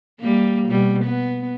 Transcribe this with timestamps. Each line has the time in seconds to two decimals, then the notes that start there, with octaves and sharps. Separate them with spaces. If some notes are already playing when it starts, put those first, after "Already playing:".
0.21 G3 A#3
0.69 B2 G3
1.04 B3